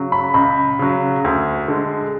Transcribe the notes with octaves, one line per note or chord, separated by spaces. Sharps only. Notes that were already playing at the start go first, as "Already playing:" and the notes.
Already playing: C#3 F#3
B5
C#2 B5
C#3 F#3
D2
D3 G#3